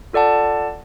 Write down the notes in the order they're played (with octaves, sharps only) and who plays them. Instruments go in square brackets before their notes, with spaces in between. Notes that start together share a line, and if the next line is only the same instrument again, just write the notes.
[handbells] F4 A4 D5 F#5 A5